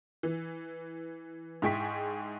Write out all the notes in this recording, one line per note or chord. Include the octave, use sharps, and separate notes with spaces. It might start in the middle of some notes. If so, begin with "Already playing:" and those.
E3
G#2 E4 G#4 G5 C#6 B6